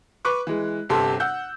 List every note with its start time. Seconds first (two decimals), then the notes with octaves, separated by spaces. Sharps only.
0.25 B4 C#6 D6 F#6
0.47 E3 G#3
0.89 G1 C3 A4 C6
1.20 F#5 E6 G6